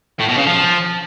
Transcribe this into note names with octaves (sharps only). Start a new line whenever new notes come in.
A2
B2
C#3
F3